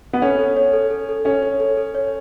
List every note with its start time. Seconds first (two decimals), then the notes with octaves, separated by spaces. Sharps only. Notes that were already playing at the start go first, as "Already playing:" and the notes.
0.13 B3
0.22 C#4 A4
0.39 A4
0.57 C#5
0.73 A4
0.90 A4
1.09 A4
1.25 C#4 A4
1.43 C#5
1.60 A4
1.77 A4
1.94 C#5